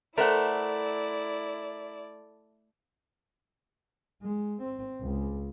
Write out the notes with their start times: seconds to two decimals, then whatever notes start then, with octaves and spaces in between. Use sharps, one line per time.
0.18 A3 E4 A#4 C5 D5 F#5
4.22 G#3
4.62 C4
5.01 C#2